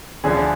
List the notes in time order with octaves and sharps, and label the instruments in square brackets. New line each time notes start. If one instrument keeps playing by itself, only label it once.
[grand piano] D2 D3 F3 G#4